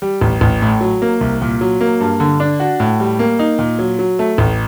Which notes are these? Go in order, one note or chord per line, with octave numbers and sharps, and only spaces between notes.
G3
A1
A1
A2
F#3
A#3
C2
A#2
F#3
A#3
G2
D3
D4
F#4
A2
G3
A#3
D#4
A#2
F#3
F#3
A3
A1